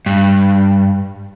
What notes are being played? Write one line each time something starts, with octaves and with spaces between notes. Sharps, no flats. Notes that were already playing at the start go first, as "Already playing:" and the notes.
G2